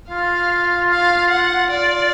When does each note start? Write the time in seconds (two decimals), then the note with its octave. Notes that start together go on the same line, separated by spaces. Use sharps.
0.10 F4 F5
0.90 F5
1.31 F#5
1.71 F4 D5